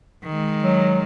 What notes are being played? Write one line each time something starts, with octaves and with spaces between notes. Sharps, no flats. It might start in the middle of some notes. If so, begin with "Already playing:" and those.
D#3 G#3
F#3